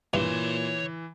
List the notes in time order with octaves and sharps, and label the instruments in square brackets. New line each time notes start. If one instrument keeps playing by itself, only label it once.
[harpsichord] G2 [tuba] A#2 [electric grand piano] E3 [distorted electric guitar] C#5 C6